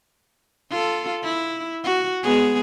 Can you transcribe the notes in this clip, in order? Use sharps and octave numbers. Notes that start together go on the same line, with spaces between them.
F4 A4
E4
F#4
G#3 B3 G#4